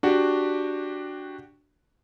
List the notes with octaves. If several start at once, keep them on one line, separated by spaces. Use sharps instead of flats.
D4 F#4 G4